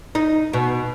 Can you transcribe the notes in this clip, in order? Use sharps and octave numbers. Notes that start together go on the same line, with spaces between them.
D#4
B2